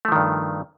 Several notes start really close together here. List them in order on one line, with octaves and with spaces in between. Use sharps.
A3 F3 D#3 G2